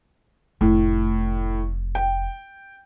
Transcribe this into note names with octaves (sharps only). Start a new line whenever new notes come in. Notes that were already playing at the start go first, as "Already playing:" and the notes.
F1 A2
G5